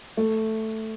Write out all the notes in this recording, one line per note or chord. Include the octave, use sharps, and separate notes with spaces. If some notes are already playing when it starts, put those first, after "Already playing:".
A3